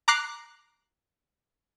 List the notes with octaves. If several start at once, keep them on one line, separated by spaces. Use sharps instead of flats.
A#5 D6 F#6 C7